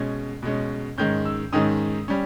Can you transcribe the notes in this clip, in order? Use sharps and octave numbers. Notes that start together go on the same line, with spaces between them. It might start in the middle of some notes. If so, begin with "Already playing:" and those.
Already playing: B2 G#3 C#4 G#6
B2 G#3 C#4
G#2 D#3 G#3 C#4 G6
E6
G#2 D#3 G#3 C#4 D#6
G3 C#4